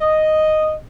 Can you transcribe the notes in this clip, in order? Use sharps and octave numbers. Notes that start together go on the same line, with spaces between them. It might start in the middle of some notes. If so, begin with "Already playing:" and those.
D#5